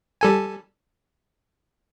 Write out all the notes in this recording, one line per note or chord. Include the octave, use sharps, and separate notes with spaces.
G3 A4 G#5